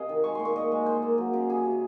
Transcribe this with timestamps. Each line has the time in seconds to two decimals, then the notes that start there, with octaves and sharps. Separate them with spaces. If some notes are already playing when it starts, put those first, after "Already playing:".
Already playing: C3 D#5 F5 G#5
0.09 D#3
0.24 G#3 C#6
0.35 A#2 C6
0.45 C#6
0.56 A#2 D#5
0.72 G#3
0.86 F4 C5
1.02 A#3
1.18 F#3
1.33 C#3
1.49 C3 G#4
1.65 C3